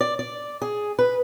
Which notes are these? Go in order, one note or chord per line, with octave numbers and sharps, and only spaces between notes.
D5
D5
G#4
B4